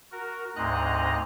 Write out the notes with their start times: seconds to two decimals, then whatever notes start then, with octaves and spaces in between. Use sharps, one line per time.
0.12 F#4 A#4
0.56 D2 G#2 C4 D#5 A#5 F#6